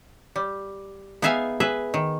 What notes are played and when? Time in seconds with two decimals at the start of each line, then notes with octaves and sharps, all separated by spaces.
0.36 G3
1.22 B3 D#4 G#4 E5 F5 G#5
1.60 G#4 B4 E5
1.94 D#3